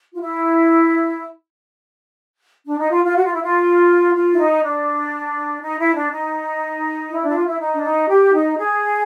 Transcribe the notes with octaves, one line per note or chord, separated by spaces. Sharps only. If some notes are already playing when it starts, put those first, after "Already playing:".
F4
E4
D4
D#4
F4
F4
F#4
F4
E4
F4
F4
E4
D#4
D4
D#4
E4
D4
D#4
E4
D4
E4
F4
E4
D#4
D4
D#4
G4
D#4
G#4